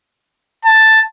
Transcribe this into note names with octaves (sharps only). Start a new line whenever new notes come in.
A5